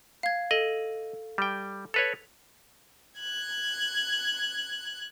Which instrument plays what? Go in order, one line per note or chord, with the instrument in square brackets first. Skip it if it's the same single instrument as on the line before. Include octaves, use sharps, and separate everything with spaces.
[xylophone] F5 G#6
[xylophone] A4 [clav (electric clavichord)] D#5
[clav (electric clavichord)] G3 G5
[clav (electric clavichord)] A4 B4 C#5 [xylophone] F7
[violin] F#6 G#6